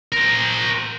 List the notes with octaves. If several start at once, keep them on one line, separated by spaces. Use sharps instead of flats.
A#4 C5